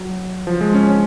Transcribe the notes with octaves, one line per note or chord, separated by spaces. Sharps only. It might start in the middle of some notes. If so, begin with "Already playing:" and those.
Already playing: F#3
F3
G#3
C#4
C#4